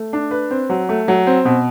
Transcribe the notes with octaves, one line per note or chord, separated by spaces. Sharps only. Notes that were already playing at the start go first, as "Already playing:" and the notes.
Already playing: A3
D4
B4
C4
F#3
A3
F#3
C4
B2